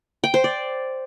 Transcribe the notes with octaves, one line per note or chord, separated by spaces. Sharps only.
G5
C5
D5